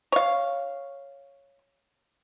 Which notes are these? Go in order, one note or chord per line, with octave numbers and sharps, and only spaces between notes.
C#5 F5